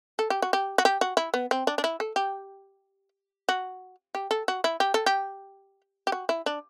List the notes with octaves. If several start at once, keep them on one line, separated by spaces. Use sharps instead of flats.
A4
G4
F#4
G4
F#4
G4
F#4
E4
B3
C4
D4
D4
E4
A4
G4
F#4
G4
A4
F#4
E4
G4
A4
G4
G4
F#4
E4
D4